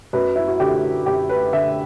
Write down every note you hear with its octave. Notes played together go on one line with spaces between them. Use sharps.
F#2 B4
E4
F#4
D3 G4
F#2 G4
B4
D3 E5